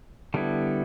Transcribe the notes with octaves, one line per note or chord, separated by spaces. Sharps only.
D3 G3 B3 E4